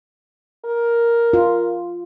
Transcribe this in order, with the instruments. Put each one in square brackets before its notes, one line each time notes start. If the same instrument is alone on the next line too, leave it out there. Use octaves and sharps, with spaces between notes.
[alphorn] A#4
[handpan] F4